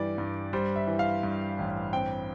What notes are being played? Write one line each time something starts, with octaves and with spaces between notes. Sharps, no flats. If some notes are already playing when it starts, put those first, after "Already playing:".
Already playing: G2 E3 G3 D5
G2
G3 C5
E5
E3
F5
G2
A1
C4 G5